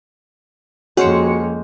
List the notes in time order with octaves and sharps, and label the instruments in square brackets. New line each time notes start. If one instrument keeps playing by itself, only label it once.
[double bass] F2 A#3 [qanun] G#3 C#4 C5 [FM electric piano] F#4 C#5 C#7